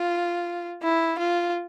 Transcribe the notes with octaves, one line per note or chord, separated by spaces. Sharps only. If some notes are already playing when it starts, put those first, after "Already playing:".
Already playing: F4
E4
F4